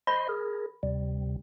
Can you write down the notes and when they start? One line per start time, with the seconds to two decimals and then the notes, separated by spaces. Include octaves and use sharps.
0.07 C5 D#5 B5 C6
0.29 G#4 A#4
0.83 D2 C3 G3